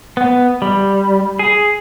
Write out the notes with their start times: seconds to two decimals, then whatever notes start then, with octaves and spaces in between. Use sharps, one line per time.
0.17 B3
0.62 G3
1.39 G#4